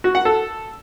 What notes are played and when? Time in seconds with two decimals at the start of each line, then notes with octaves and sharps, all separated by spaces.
0.04 F#4
0.15 F#5
0.25 A4